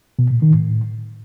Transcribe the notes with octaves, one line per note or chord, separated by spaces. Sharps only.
B2
A#2
D#3
A2